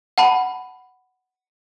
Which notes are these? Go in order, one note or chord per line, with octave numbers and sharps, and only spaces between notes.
F#5 A5 B5